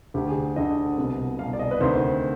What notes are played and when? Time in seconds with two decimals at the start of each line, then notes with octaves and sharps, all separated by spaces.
0.14 D2 D3 G4
0.29 G#4
0.56 D2 D3 D#5
0.97 C2 B2
1.39 C2 B2 F5
1.53 D5
1.59 D#5
1.71 B4
1.80 D2 C3 D#3 C5